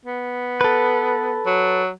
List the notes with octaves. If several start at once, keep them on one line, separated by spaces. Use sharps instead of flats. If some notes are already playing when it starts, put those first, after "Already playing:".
B3
A4 B4
F#3